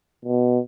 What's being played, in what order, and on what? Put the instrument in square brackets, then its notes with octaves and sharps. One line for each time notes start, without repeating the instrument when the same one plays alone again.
[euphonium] B2